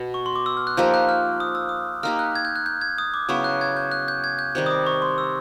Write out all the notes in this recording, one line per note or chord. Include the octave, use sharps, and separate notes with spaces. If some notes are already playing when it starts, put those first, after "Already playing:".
Already playing: B2
C#6
C6
D6
E6
F6
F#6
F3 A#3 D#4 G4 G6
F#6
F6
D#6
E6
D#6
A#3 D#4 G4 F6
F#6
G#6
G6
F#6
G6
G#6
D#6
D6
C#3 F#3 B3 E4 C#6
F#6
G#6
G6
F#6
G6
G#6
G6
C3 D#3 G3 G6
D#6
D6
C#6
C6
E6